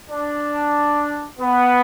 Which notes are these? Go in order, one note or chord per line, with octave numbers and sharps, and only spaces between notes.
D4
B3